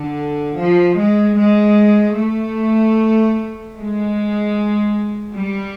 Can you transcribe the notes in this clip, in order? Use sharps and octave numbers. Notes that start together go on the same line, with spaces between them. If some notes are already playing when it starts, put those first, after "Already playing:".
Already playing: D3
F3
G#3
G#3
A3
G#3
G3